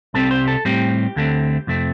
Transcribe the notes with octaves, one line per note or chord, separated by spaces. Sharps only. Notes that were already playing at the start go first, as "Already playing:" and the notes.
C2 C3 G3 C4 A4
C5
A4
A2 G3 C4 G4
D2 D3 A3 C4
F2 C3 A3 C4